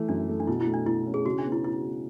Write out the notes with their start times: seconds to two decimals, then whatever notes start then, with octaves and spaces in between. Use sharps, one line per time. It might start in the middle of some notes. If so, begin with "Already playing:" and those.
Already playing: E3 A3
0.09 F#2 D4
0.29 A3
0.40 D4
0.47 B2 E4
0.61 E4
0.67 A3
0.74 D4
0.86 B2 E4
1.07 C#4
1.14 G#4
1.26 C#3 F#4
1.39 D4
1.45 B3
1.52 E4
1.64 E4 F#4
1.84 B3